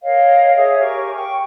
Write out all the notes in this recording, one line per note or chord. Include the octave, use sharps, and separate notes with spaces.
A#4 C#5 D#5 F5
G#4 C#5 E5 F5
G4 A#4 G#5 C#6
G5 C#6